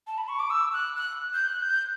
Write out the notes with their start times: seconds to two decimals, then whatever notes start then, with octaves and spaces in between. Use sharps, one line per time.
0.07 A5
0.18 B5
0.28 C#6
0.39 D6
0.50 E6
0.73 F#6
0.96 F#6
1.34 G6
1.48 F#6
1.62 G6